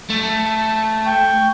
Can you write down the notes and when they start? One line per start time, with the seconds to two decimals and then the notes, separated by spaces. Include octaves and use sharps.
0.10 A3
1.06 G5 C#6